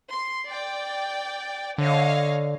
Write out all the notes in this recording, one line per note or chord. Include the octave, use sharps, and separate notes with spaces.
C6
D5 G5
D3 C#5 D#5 F5